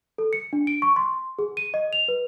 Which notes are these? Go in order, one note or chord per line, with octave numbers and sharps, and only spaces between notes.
A4
C#7
D4
D7
C#6
C6
G#4
D#7
D#5
F7
B4